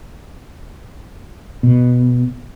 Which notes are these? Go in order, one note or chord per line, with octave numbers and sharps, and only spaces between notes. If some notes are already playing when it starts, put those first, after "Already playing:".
B2